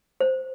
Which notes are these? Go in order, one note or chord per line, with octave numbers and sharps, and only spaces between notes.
C5